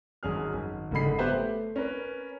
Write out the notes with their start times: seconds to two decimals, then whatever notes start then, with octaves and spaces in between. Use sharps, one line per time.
0.23 G#1 F#2 G#4 F6
0.53 G#1
0.91 F#1 G#2 D3 A4 B5 C7
1.18 B3 G4 B4 C5 E5
1.33 A3
1.76 C#4 A#4 B4